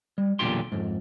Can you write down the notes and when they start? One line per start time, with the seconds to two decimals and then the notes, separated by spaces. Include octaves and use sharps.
0.18 G3
0.39 B1 E2 A#2 D3 G4 C6
0.72 F2 G#2